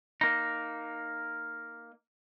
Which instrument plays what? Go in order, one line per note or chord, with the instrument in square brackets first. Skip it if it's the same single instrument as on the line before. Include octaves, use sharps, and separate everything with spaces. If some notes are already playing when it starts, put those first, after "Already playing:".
[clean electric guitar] A#3 D#4